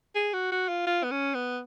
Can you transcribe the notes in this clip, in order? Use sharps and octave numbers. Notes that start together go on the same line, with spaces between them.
G#4
F#4
F#4
F4
F4
B3
C#4
B3